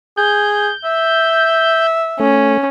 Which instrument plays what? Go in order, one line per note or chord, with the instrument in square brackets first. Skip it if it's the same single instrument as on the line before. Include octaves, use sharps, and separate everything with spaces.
[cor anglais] G#4 [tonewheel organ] G6
[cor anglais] E5
[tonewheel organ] A3 [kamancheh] C#4